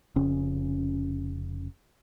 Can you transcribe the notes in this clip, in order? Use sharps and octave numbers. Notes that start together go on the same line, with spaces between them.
F1 C#3 C#4